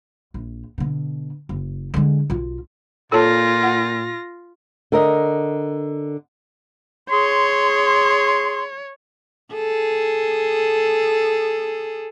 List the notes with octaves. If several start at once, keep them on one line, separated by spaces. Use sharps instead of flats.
A#1
B2 D3
F#1
D3 G#3
B1 F4
A#2 F4 A4 C#5 A5 A#6
F#5
D3 A#4 D#5
G#4 C#5 C6
G#4 A4